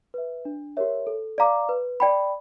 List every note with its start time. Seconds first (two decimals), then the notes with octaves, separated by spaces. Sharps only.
0.14 B4 E5
0.45 D4
0.77 G4 A#4 C#5 E5
1.07 A4
1.38 D5 F5 A#5 D6
1.69 B4
2.00 D5 G5 B5